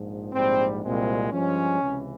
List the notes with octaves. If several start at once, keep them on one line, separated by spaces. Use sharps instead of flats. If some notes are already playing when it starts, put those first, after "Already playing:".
Already playing: A#1 G#2 F3
A#1 G#2 G3 C4
C2 A#2 G#3 C4
G2 F3 G#3 C#4
C#2 C3 E3